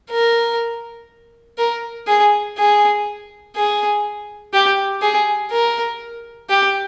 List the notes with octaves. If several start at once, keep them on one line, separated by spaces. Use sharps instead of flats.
A#4
A#4
G#4
G#4
G#4
G4
G#4
A#4
G4